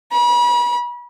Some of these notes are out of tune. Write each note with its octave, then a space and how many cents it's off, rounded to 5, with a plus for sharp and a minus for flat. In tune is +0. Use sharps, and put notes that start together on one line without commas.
B5 -40